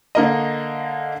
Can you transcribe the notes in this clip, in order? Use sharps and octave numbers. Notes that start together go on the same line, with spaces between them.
D3 A#3 D#5